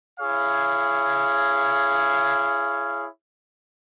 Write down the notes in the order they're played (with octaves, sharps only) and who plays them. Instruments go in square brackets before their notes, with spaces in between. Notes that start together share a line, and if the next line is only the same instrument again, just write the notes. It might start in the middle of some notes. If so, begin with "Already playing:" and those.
[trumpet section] E4 G#4 C#5 F5